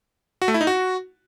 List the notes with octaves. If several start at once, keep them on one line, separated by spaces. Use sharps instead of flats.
F#4
A3
E4
D#4
F#4